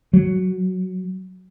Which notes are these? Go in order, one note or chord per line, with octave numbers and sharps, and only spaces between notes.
F#3